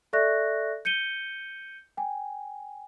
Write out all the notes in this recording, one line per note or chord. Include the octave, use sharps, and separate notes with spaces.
A4 D5 E5 C#6 F#6 A#6
G6 C#7 D#7 G7
G5 G#5